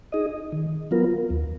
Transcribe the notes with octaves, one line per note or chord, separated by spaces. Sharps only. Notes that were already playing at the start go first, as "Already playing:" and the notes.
D#4 G#4 D#5
D#3
F#3 B3 F4 A#4
D#2